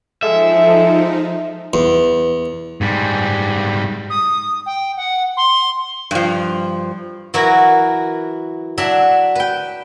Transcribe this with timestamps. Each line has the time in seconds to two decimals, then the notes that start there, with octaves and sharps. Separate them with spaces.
0.23 F3 G#3 D#4 A4 E5
1.73 E2
2.81 G#2 G3
4.10 D#6
4.66 G5
4.97 F#5
5.37 C6
6.11 G2 F3
7.34 E3 F#3 E4 F#4 A#4
8.78 F#3 D4 E5
9.35 B4 G5